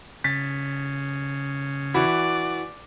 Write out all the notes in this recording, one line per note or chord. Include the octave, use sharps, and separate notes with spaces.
C#3 A6 B6
E3 F#4 D5 B5